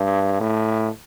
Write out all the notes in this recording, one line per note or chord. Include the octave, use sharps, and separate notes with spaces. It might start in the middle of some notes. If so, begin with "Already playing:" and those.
Already playing: G2
A2